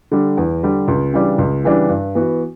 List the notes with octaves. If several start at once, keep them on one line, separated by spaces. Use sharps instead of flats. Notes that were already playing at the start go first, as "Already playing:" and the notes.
D3 G3
E2
D3 G3
C#2
C#3 E3 G3 D4
C#2
C#3 E3 G3 D4
G2
E3 B3 F#4